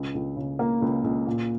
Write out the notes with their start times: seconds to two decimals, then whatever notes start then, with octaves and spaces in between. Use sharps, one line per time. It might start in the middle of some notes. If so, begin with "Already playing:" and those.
Already playing: C#2
0.14 C#2
0.36 C#3
0.59 A#3
0.82 C#2
1.04 C#2
1.27 A#2